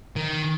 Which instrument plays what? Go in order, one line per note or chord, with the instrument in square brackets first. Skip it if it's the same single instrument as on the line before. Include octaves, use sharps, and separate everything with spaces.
[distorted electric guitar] D#3